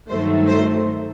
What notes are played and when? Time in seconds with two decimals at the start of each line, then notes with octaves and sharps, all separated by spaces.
0.08 G2 D#3 F#3 A3 C5
0.47 C5